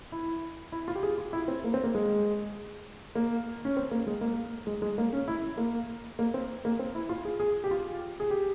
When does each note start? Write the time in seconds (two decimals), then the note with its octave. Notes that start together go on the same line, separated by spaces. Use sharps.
0.12 E4
0.72 E4
0.88 F4
0.95 G4
1.03 G#4
1.18 F4
1.33 E4
1.48 C4
1.64 A#3
1.74 C4
1.84 A#3
1.95 G#3
3.15 A#3
3.65 C#4
3.77 C4
3.91 A#3
4.07 G#3
4.21 A#3
4.67 G#3
4.82 G#3
4.98 A#3
5.13 C#4
5.28 E4
5.57 A#3
6.19 A#3
6.34 C4
6.65 A#3
6.79 C4
6.95 E4
7.09 F4
7.25 G#4
7.40 G#4
7.64 G4
7.71 F4
8.20 G#4
8.30 G4